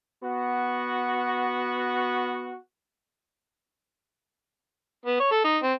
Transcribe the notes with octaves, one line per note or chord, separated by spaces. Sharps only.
B3 F#4
B3
C#5
A4
D#4
C4